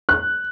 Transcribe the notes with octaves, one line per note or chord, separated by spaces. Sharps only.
F#6